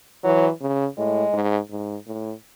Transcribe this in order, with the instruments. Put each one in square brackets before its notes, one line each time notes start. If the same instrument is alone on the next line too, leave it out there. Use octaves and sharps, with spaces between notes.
[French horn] E3 [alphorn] F#3
[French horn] C#3
[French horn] A2 [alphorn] G#3
[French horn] G#2
G#2
A2